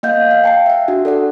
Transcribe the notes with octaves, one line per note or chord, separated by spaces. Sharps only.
A#3 D#5 F5 F#5 G6
F5
G5 A5 C7
E5 F#5
D4 F#4
A4 D5 F#5